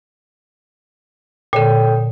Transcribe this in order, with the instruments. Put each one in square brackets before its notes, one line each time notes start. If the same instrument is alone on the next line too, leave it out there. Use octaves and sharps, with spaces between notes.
[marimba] A#2 D3 [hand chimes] A4 C#5 G5